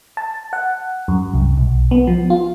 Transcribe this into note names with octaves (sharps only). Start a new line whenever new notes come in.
A5
F#5
F#2
C2
B1
B3
F3
F4